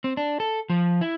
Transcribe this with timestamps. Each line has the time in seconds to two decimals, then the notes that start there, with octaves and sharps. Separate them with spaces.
0.04 C4
0.17 D4
0.40 A4
0.70 F3
1.01 E4